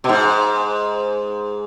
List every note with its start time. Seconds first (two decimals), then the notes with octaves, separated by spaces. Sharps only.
0.04 B2
0.09 G#2